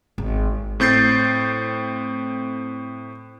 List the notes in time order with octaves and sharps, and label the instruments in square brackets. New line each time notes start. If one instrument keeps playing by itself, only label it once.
[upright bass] G#1
[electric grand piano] A2 C4 G6 A6 C7